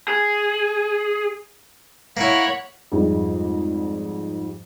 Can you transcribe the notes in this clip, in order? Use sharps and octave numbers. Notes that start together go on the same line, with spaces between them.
G#4
A#3 E4 C#5 F#5 B5
F2 G#2 G3 G#3